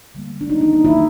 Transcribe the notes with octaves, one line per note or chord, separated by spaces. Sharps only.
D3 G3 A#3
D4
D#3 F#3 A#3 D#4
D#4
D#4
D#3 F#3 A#3 E4